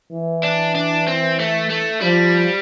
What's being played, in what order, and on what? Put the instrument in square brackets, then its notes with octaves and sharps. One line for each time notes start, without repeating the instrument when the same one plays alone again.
[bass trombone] E3
[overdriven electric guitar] D4
D4
C4
A3
A3
[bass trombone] F3 [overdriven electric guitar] G3